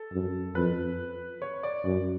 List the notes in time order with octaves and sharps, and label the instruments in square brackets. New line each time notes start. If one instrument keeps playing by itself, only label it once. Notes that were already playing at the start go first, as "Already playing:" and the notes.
Already playing: [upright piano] A4
[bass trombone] F#2
[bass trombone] F2 [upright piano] B4
[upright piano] C#5
D5
[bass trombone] F#2 [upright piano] D5